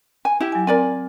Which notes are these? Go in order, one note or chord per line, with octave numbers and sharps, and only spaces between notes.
G#5
E4 G4
F#3 G#5
C4 A#4 D5 G#5